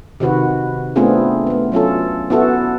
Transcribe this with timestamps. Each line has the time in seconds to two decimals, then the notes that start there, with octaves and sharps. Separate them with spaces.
0.20 C3 D#3 F#4 B4
0.96 A3 B3 C4 D4 F4 G#4
1.47 A3 B3
1.72 F#3 C#4 F4 A4
2.30 B3 E4 F#4 A4